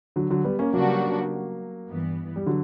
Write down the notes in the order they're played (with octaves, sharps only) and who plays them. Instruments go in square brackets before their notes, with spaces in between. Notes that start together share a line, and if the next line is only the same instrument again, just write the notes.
[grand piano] D3 F#3
D3 F#3
G3 B3
A#3 C#4
[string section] C#3 G3 B3 D4 F#4 [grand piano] F#3 A#3
[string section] G2 E3 B3
[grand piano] G3
D3 F#3